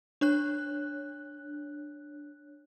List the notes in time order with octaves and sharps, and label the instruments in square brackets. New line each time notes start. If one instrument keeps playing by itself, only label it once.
[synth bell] D4 C#5 F#6